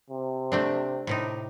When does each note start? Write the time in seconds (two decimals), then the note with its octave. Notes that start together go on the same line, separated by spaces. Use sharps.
0.10 C3
0.52 A3 C4 D4
1.07 A2 C3 D#4